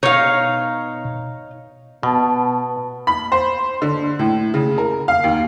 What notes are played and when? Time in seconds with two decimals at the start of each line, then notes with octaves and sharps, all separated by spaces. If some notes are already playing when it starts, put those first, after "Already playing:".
0.03 B2 D#4 C#5 F5
2.03 B2 B3 A5
3.07 B5
3.32 C5
3.82 D3
4.19 A2
4.54 C#3
4.78 A#4
5.08 F5
5.24 D#2